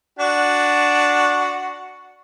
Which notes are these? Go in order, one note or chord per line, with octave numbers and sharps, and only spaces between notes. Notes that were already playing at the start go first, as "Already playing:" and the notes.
D4 F#4